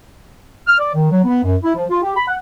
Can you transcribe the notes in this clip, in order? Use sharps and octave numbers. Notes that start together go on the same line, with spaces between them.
F6
D5
D#3
F#3
B3
F#2
E4
F3
F4
G4
B5
F#5